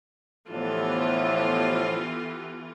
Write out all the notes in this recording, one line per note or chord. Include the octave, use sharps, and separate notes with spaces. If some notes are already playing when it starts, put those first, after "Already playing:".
A2 D3 E3 F3 B3 F4 G4 A4